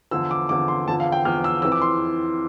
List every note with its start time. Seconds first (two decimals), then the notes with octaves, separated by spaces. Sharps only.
0.11 E2 D3 F3 E6
0.31 D6
0.49 E2 D3 F3 D6
0.68 C6
0.87 E2 D3 F3 A5
1.00 F5
1.12 G5
1.25 E2 D3 F3 F6
1.44 E6
1.62 F2 E3 E6
1.72 D6
1.82 C6